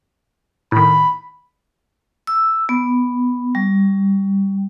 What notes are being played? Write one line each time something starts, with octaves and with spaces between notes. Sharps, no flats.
A2 D#3 B5
E6
B3
G3